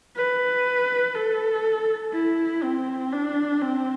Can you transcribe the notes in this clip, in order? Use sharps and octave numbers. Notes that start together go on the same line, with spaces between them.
B4
A4
E4
C4
D4
C4